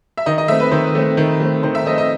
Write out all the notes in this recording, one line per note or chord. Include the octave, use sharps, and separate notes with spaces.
E5
D#3 D#5
D#5
A3 C4 E5
B4
D#3 C5
A3 C4
D#3
A3 C4
D#3 C5
E5
A3 C4 D#5
D#5